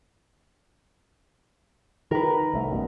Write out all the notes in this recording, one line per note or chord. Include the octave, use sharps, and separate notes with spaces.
D#3 A#4 B4
C2 A3
A#1 F#2 B2